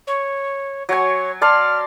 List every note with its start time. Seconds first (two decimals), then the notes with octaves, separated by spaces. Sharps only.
0.07 C#5
0.89 F#3 C#5 G#5
1.41 D5 A5 C6 F6